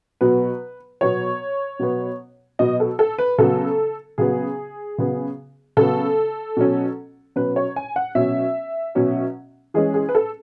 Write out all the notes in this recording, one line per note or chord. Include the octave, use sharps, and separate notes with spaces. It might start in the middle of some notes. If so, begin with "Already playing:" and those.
B2 F#3 B3 B4
B2 F#3 B3 C#5
B2 F#3 B3
B2 F#3 B3 D#5
A4
A4
B4
C#3 F#3 B3 A4
C#3 F#3 B3 G#4
C#3 F#3 B3
C#3 F#3 B3 A4
B2 F#3 C#4
B2 F#3 C#4 B4
C#5
G#5
F#5
B2 F#3 C#4 E5
B2 F#3 C#4
E3 G#3 C#4 G#4
G#4
B4
A4